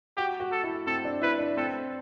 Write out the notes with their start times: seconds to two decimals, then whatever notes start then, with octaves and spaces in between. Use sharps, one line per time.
0.17 F#4 G4
0.40 F#4
0.52 A4
0.63 E4
0.87 C4 A4
1.05 D4
1.22 E4 B4
1.39 D4
1.57 C4 A4